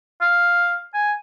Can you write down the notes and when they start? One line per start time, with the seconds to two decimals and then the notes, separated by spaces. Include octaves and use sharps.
0.21 F5
0.94 G#5